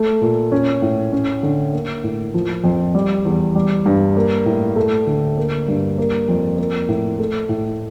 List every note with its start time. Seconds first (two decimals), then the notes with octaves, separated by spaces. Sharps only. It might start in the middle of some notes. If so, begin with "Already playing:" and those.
Already playing: A3
0.21 A#2
0.52 C#4
0.82 A2
1.12 C#4
1.43 D3
1.73 A#3
2.04 A2
2.34 F3
2.64 F2
2.95 G3
3.25 E2
3.55 G3
3.86 G2
4.16 A#3
4.46 A2
4.76 A3
5.07 D2
5.37 A#3
5.68 G2
5.98 A#3
6.29 F2
6.58 A#3
6.89 A2
7.19 A3
7.49 A2